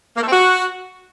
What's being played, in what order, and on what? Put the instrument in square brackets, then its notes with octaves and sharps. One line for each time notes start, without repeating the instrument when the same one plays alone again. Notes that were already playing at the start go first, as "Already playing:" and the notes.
[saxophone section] A#3
A3
C4
F#4